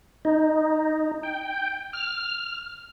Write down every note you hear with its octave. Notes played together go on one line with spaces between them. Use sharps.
D#4
G5
F6